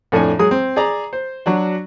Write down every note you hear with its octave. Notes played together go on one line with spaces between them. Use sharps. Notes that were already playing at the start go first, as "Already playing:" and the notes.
F2 A2 A3 D4 G#5
F#3 G#3 G#4 D#6
C4
G#4 D5 A#5
C5
F#3 D4 F#4